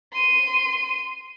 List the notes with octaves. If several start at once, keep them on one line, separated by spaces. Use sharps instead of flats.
C6 D#7